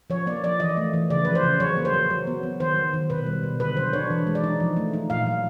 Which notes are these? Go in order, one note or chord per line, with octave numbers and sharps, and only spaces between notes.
F3 C#5
A#3 D5
F3 D5
E3 D#5
A3
E3
C#3 D5
F3 B4
C5
C#3
F#3 C#5
A#3
C5
F#3
F#3
B3
F#3
D#3 C5
F#3
D#3
B2 B4
G3
B2
D3 B4
F#3 C5
D4 C#5
E3
G#3
D5
D#4
F3
A3
D#4
A#2 F5
F#3